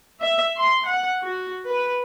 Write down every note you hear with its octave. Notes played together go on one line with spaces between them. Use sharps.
E5
C6
F#5
F#4
B4